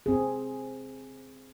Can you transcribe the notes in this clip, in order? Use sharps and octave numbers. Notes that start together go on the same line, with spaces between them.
C4 G#4